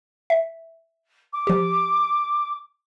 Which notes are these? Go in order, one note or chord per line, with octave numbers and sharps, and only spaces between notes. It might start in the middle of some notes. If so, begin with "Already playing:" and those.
E5
D6
F3 G4